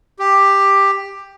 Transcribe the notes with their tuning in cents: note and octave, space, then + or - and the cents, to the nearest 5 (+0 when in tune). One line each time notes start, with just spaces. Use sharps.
G4 +10